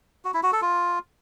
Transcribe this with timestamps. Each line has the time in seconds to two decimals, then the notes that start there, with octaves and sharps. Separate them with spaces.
0.25 F#4
0.34 E4
0.43 F#4
0.52 A4
0.62 F4